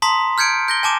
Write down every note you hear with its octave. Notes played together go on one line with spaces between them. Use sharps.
A5 A#5 C6 D#6 B6
F6 G6 G#6 C#7 D7
G6 A#6 G7
G#5 A5 D6 E7